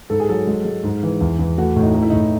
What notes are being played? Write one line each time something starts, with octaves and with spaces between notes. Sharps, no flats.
G#2 A4
G#4
F#3 A4
G#3
G#3
G#2
E3
E2
E2
A3 F#4
A2
D#4
A3 D#4
E4
A2 D#4